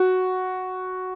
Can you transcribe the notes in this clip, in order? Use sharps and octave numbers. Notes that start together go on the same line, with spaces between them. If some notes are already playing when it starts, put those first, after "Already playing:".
Already playing: F#4